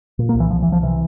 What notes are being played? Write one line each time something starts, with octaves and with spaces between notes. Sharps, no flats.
A#2
A#3
C2
E3
C2 F3
E3
C2 F3
C3 E3